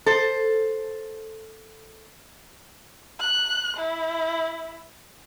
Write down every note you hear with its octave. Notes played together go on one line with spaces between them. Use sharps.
A4 C5
F#6
E4